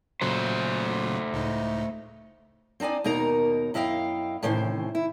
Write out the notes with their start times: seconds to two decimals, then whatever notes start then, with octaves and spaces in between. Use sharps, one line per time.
0.21 A#2 C#3 F#3 A3 A4 C5
1.33 C#2 A2 D#4
2.80 C4 D4 D#4 D5 G#5
3.04 D#2 B2 D#4 A#4 A#5
3.74 F#2 E4 D#5 F5 G5
4.43 A2 C3 D#3 E3 C#4 C5
4.95 E4